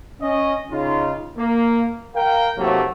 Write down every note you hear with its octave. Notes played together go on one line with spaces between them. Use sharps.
C#4 D#5
C#3 D#4 F4
A#3
A#4 F5 G5
D#2 A2 C3 F#3 A3 A#3